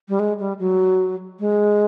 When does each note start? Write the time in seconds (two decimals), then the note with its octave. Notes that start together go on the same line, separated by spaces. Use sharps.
0.09 G3
0.19 G#3
0.39 G3
0.59 F#3
1.40 G#3